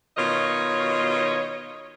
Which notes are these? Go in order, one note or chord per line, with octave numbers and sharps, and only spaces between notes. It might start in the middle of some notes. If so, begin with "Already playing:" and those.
B2 D#3 F4 C#5 D#5